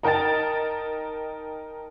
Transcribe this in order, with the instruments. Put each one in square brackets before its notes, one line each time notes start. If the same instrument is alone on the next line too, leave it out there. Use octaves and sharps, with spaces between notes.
[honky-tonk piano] D#4 A#4 G5 A5 A6